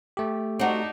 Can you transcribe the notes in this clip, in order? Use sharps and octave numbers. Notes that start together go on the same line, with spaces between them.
A3 G4
C4 D4 D#4 F#4